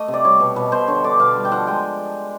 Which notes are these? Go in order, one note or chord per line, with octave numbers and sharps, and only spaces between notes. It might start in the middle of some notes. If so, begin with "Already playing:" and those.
Already playing: A3 D#5
C3
D5
G3 C#5
B2
B2 B4
B2 C5
D3 C#5
D3 D5
B2 F5
G3
G5
F3 F#5
G#3 G5